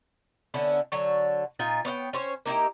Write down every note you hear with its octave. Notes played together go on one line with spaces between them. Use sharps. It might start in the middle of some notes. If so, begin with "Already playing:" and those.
D3 B3 C#4 E4
D3 F#3 C#5
A#2 D#4 F4 G#5
B3 C#5 F#5 G5
C#4 C5 C#5
A#3 D#4 E4 G4